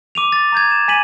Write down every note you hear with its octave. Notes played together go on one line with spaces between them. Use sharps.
D6 D#7 F7
A6
A#5 G6 G#6
E7
G#5 B6 D#7 F#7